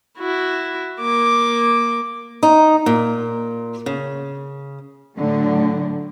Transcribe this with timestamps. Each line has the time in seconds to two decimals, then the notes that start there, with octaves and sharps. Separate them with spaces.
0.18 E4 F#4
1.00 A#3 D6
2.43 D#4
2.86 A#2
3.86 C#3
5.17 A2 D3 F#3